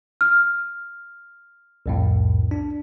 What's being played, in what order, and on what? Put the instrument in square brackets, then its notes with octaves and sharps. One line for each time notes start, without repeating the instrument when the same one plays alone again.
[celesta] F6
[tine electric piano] C2 F2 A2
D4